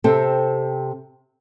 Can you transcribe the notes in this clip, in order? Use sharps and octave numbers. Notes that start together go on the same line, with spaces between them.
C3 C4 A4